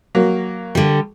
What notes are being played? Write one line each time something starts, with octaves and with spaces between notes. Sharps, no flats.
F#3 A#3
D3 G3